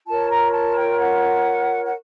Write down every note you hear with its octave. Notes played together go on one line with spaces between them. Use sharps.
F4 A#4 C#5 A5
A#5
A5
G5
F#5
F#5